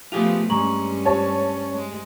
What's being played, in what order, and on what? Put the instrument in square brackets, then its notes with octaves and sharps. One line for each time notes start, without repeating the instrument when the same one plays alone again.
[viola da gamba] F3 A3 B3 [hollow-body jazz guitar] F4 G4 G#4 [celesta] F7
[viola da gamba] G2 C#4 [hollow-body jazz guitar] G#3 [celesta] A#5 C#6 F#7
[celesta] G4 C5 [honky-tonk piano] C#5 A5
[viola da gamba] G#3